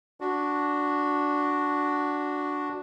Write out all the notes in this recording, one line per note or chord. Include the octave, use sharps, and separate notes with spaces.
D4 F#4